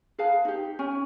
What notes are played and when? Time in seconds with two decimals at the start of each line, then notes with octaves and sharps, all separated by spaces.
0.18 G#4 B4 F5 A5
0.45 D#4 G4
0.79 C#4 G#5